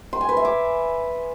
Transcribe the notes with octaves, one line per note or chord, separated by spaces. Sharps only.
C6
G#5
B4
E5
D6